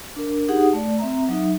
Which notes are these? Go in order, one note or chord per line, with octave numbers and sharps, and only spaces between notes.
D4 A#4
D#4 G4 G#4 F#5 D#6
A3 D5
C4 E5 A#5
F#3 D#4 E5